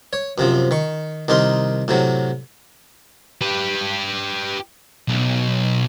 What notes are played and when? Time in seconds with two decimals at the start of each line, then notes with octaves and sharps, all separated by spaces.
0.13 C#5
0.38 F#2 C3 F3
0.71 D#3 C#6
1.28 C2 D#3 D#4 A#4 C6
1.88 A2 C3 F#3
3.41 G4 B4
5.08 B1